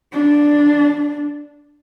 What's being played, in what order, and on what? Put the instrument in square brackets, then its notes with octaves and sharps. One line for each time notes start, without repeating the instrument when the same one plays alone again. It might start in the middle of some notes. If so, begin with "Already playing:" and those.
[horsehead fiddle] D4